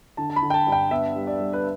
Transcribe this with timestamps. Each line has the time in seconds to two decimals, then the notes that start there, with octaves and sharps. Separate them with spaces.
0.17 D3 A5
0.30 A5
0.36 B5
0.42 D3
0.50 G5
0.54 A5
0.67 G2
0.72 G5
0.91 B3 E5
1.16 G3
1.27 D5
1.40 G3
1.53 B4